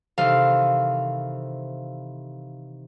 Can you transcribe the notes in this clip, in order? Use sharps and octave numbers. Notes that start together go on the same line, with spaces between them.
C3 D#3 E3 A4 F5